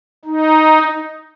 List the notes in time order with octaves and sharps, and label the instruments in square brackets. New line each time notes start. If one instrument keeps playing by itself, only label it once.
[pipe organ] D#4